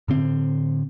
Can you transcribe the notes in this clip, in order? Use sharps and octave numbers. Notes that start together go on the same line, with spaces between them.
A2 D3 C4